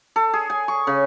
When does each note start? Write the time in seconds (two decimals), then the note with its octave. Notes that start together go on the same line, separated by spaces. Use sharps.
0.16 A4
0.33 G#4
0.50 G#5
0.68 C#6
0.87 C#3